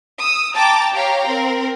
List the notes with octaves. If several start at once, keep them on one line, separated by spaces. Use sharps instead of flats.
D#6 E6
G5 A5 A#5 D6 A6
G4 C#5 F5 G5 A#5
C4 A#4